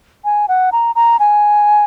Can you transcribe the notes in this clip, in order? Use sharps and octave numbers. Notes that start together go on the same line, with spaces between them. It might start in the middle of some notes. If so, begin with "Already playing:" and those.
G#5
F#5
A#5
A#5
G#5